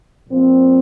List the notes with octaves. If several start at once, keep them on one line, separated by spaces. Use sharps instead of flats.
A#2 F3 C4